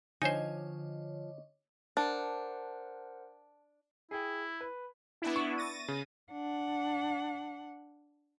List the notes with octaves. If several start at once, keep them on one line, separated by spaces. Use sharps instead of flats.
D3 F3 D#4 C5 C#5 D#5 G#5
D4 A#4 C5 F#5 A5
E4 G#4 G5
B4
B3 D4 E4
C#6
A6 A#6 D#7
C#3
D4 F#5